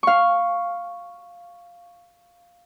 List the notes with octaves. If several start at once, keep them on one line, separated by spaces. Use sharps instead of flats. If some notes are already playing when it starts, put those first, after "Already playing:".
F5 C#6